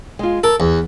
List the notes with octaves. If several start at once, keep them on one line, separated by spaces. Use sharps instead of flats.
G#3 F4
A4 A#4
E2 B3